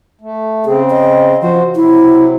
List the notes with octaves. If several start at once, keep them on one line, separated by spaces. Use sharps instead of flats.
A3
C#3 C4 G#4
D#5
F3 F#4 C5
C3 F#3 E4